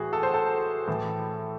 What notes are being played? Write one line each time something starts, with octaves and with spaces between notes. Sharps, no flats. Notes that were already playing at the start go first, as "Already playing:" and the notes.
Already playing: A2 E3 F#4 G#4
A4
C5
A4
A2 E3